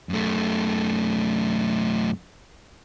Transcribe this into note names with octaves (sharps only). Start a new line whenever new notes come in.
F#2 A3